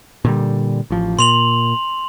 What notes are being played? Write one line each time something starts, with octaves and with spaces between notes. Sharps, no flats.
A#2 D3 G3
A1 F3
A#2 C6 F7 F#7